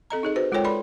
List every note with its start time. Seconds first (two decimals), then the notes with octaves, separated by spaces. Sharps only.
0.10 C4 A4 D#5 A#5
0.23 D#4 G#4 D#5
0.36 F#4 B4 C5
0.52 G#3 F4 A4 A#4 C#5 G5
0.64 A4 B4 D5 B5 C6